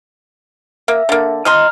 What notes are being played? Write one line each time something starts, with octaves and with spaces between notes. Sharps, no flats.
A#3 E5
D3 A#3
F3 D#5 A#5 C6 F6